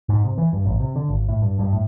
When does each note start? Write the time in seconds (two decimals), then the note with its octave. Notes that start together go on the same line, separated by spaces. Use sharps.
0.09 G#2
0.24 C3
0.38 E3
0.53 G2
0.66 A1
0.80 C3
0.96 D3
1.09 G#1
1.28 A2
1.42 G2
1.59 G2
1.73 A2